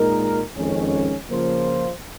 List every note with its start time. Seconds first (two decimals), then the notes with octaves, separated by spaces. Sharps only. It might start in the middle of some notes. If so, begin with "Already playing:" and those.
Already playing: A#2 G#3 D#4 A#4
0.56 F2 D#3 G#3 C#4
1.29 C#3 F3 A#3 F4 C5